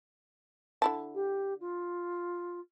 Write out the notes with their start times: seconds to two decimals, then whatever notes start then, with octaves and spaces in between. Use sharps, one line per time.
0.82 D3 E4 A5
1.14 G4
1.60 F4